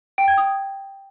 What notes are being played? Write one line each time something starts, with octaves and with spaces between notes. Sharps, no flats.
G5
G#6
D#6